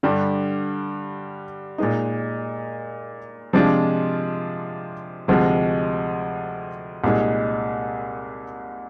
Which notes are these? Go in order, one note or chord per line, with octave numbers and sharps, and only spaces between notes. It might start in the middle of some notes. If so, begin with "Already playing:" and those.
G2 D3 G3
A#2 G#3 D#4
C3 F3 G#3 D4 F4
D2 C3 F3 G#3
C2 A#2 G#3 D#4